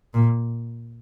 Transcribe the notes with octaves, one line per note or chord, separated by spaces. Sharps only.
A#2